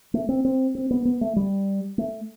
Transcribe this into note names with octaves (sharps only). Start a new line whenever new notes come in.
A3
C4
C4
C4
B3
B3
A3
G3
A3